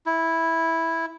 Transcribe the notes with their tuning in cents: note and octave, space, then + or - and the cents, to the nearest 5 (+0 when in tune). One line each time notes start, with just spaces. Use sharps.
E4 -5